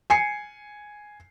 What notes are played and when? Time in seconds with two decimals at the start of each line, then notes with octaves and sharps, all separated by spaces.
0.10 G#5 C7 C#7